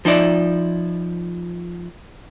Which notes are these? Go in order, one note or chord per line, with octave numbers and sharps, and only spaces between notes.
F3 D#4 E4 D5